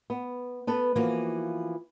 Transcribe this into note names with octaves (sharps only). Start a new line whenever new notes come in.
B3
B3 A4 B4
E3 F3 A#3 F#4